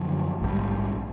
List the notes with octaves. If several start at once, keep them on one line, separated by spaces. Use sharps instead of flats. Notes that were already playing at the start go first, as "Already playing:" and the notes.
Already playing: F#2 D3 F3
A#1 G#2 D#3 G3